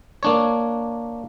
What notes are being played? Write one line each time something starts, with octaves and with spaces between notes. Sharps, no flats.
A#3 D4 C#5